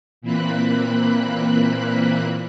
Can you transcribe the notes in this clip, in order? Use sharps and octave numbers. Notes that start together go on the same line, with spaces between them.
A#2 E3 A#3 C4 B5 F#6